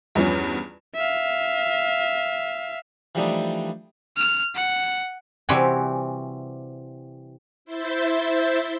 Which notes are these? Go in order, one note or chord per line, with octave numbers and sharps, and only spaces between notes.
E2 G2 F3 C#4
E5 F5
E3 F3 G3 A3 D4 D#4
F6
F#5
C3 E3 G3 C4 F#4 G#5
E4 C5 E5 G6 A6